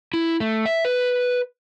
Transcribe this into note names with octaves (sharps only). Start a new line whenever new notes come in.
E4
A3
E5
B4